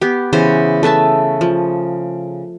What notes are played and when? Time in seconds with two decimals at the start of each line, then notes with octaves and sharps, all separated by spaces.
0.01 B3 G4
0.33 C#3 E3 B3 C5
0.83 A3 B4 E5 A5
1.41 F3